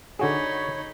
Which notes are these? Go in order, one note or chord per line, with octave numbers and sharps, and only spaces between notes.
D3 D#4 F#4 G#4 C#5 B5